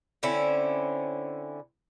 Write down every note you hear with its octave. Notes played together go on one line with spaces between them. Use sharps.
D3 C4 C#4 E4